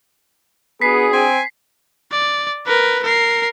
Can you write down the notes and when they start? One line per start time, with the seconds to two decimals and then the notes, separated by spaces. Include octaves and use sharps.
0.82 B3 D4 F#4 G#4 B6 C7
1.13 C4 G#5
2.11 D5
2.66 A#4 B4
3.03 A#4 C7